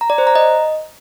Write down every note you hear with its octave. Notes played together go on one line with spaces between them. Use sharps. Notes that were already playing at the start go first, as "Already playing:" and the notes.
A#5
D5
C5
A#5
D#5